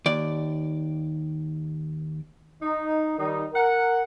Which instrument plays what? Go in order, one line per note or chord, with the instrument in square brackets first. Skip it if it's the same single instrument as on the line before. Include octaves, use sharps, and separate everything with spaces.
[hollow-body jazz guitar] D#2 D5
[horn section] D#4
D#3 G3 D#4
A#4 F#5